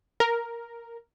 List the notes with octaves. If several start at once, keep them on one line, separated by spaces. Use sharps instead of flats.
A#4